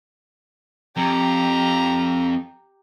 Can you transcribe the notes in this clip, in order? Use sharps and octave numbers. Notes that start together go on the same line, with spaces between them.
F2 G4 A#5